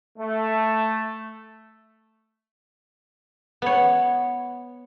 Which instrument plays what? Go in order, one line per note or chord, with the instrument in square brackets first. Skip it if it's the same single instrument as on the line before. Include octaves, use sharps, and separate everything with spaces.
[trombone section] A3
[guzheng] B3 C#5